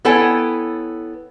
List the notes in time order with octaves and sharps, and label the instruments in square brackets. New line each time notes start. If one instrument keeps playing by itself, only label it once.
[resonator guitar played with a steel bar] B3 E4 A4 C#5 G5 G#5